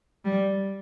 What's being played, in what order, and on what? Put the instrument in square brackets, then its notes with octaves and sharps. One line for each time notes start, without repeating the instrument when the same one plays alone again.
[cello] G3